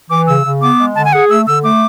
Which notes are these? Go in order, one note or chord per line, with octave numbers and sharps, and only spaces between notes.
E3 D6
C#3 E6
C#3
B3 D6
G#3
D3 A5
G#5
G#4 F#5
A3 E6
D3 E6
A3 D6